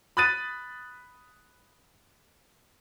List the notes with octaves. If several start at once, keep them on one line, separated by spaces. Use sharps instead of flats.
B5 D#6 F#6 A6 D#7